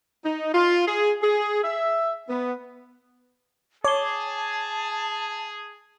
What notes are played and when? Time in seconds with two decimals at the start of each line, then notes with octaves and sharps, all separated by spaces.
0.24 D#4
0.54 F4
0.86 G#4
1.22 G#4
1.64 E5
2.29 B3
3.84 G#4 C#5 A5 D6 G7